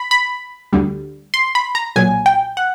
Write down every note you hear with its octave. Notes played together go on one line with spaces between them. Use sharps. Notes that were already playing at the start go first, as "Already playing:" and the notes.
Already playing: B5
B5
D2 D3 G3
C6
B5
A#5
B1 A#2 F#3 G#5
G5
F#5